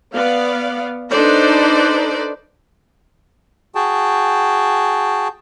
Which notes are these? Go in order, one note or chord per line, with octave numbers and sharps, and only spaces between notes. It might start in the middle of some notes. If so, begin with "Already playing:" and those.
B3 D5 F5
D4 D#4 A4 B4 C5 D5
F#4 G#4 G5 A5